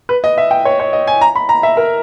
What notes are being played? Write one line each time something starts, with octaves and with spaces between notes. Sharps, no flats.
B4
D#5
E5
G5
C#5
C#5
D#5
G#5
A#5
B5
A#5
E5
A#4